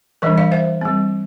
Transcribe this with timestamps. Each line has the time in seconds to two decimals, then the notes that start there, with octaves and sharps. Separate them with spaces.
0.22 E3 G3 D4 A#4 D5
0.38 D5 F5
0.52 C5 E5
0.81 G3 C4